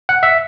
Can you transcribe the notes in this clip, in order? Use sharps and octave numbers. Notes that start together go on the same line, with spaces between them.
F#5
E5